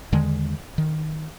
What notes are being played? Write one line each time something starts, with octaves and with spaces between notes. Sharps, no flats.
E2 D3 D#3 G#3
D#3